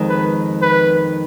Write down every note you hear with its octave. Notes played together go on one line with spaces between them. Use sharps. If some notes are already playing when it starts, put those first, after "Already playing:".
Already playing: F2 D#3 G#3
B4
B4